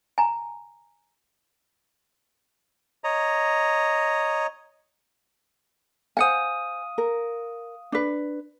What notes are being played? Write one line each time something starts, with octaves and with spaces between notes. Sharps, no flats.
G#5 A#5
C#5 D#5 A#5
C5 F5 F#5 G#5 D#6
A#4
D4 B4